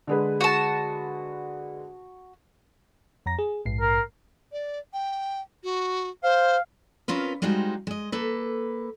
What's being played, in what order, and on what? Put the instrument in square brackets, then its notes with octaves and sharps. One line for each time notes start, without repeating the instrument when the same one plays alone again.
[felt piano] D3 G#3 B4
[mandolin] F#4 A5
[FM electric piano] F2 A#5 A#6
G#4
A#1 G#2 C7
[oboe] A#4
[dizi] D5
G5
F#4
[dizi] C5 [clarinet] F5
[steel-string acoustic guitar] C4 C#4 F4 A#4 B4
G3 G#3 C4 D#4 F4 F#4
G#3 D#5
A#3 A4 B4